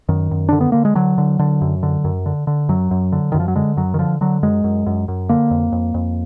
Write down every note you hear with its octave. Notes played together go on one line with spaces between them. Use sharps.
F#2 D#3
F#2
D3 D4
B3
D3 A#3
G#3
D3 F#3
D3
D3
F#2
D3
F#2
D3
D3
F#2 F#3
F#2
D3
F#2 D#3
F3
F#3
D3 G#3
F#2 F#3
D#3
D3 F3
D3 F#3
F#2 G#3
F#2
F#2
F#2
D3 A#3
F2
F2
F2